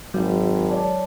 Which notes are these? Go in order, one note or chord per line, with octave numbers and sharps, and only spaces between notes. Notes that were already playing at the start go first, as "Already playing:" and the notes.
G#1 F#3
C#5 D5 A5